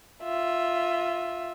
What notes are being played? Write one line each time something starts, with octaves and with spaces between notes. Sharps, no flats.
F4 E5